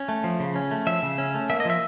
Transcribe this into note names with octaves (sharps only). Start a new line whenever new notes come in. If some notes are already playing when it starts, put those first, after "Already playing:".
Already playing: C#4
A3
F3
C#3
C#4
A3
F3 E5
C#3
C#4
A3
A#3 E5
D#5
F3 E5